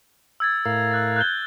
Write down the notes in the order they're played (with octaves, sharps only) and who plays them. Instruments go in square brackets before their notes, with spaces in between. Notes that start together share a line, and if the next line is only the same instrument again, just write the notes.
[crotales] E6 G#6 A6
[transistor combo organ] A2 A#4 F5
[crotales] E6 F#6 A6
F#6 G6 G7